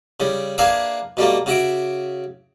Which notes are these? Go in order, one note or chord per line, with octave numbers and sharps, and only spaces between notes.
C#3 G3
A#3 D4 G#4 B4 E5 F5
B2 G3 A3 A#3
C#3 F#4 E5 D6